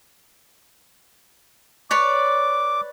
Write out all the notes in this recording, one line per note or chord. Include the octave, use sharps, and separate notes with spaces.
B4 C#5 D5 D6